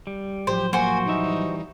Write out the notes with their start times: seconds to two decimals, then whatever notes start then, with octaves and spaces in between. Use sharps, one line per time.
0.07 G3
0.47 A2 F3 F#3 G4 C5
0.73 A#3 F#4 C5 G#5
1.06 E3 G3 D#4 E5